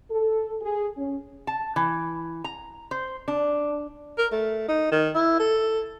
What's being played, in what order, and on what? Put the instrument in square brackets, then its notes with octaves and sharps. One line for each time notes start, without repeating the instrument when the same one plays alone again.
[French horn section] A4
G#4
C#4
[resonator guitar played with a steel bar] A5
E3
A#5
C5
D4
[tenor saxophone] A#4
A3
D#4
D#3
E4
A4